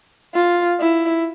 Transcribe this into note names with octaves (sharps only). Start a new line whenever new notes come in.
F4
E4